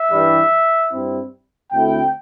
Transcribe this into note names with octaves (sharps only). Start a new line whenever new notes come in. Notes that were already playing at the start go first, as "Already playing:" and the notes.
Already playing: E5
G2 E3 G3
G2 G3 C4 E4
D2 D3 A3 C4 E4 G5